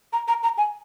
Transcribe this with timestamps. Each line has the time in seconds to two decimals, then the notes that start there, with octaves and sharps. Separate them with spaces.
0.13 A#5
0.28 A#5
0.43 A#5
0.58 G#5